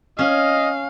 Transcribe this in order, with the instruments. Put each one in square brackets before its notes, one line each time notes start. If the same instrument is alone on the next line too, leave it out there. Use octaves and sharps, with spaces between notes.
[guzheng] C#4 [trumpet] D#5 [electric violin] F5